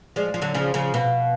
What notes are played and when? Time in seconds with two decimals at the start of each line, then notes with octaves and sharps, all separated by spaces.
0.16 F3 G#3 D5
0.34 F3
0.42 D3 F#3
0.54 C#3 F3
0.74 C#3 F3
0.94 B2 F5